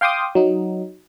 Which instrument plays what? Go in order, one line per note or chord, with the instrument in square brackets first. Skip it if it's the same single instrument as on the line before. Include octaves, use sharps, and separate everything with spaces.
[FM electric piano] F5 G5 C6 D6 D#6
F#3 D#4